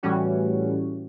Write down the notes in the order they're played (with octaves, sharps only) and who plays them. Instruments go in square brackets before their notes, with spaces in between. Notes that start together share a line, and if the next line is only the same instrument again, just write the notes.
[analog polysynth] A2 E3 G3 A3 C#4 F#4